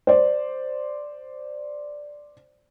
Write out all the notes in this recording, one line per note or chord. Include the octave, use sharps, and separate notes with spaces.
C5 D5